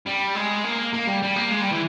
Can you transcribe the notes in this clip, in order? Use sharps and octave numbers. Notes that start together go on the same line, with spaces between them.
G3
G#3
A#3
A#3
G3
G3
A#3
G#3
G3
E3